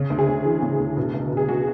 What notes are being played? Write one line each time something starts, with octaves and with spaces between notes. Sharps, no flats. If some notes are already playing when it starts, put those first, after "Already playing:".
Already playing: C#3
D2
G#4
D2
E3
C#3
D2
B2
C#2
B2
G#4
F#4